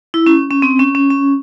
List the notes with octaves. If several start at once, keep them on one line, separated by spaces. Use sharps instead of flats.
E4
C#4
C#4
C4
C#4
C#4
C#4